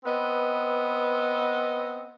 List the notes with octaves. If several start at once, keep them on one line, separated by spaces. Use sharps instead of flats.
B3 C4 B4 D#5